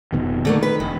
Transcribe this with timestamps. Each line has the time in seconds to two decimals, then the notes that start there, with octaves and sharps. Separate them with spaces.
0.13 F1 B2 D#3
0.45 D3 D#3 A3 A#3
0.63 B4
0.80 E1 D#3